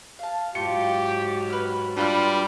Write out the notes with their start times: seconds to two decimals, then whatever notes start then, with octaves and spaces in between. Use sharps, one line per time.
0.19 F5 A5
0.55 G#2 F#3 F4 G4 C#7
1.50 B4 F6
1.97 G3 D4 F4 B4 B5 C6 F6